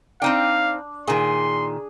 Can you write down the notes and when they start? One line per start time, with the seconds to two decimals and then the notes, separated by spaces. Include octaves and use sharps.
0.22 C4 D4 D#4 F5 G5
1.07 A#2 D#3 G#4 C6